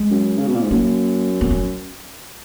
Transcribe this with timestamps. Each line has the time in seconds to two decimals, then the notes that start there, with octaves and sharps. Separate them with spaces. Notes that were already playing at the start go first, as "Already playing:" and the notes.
Already playing: G#3
0.11 F#2
0.39 C#3
0.47 B2
0.55 A#2
0.63 G#2
0.71 F#2 A#3
1.41 B3
1.51 C#4